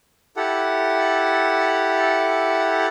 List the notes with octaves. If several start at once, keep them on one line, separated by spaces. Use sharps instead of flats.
E4 G4 A4 F#5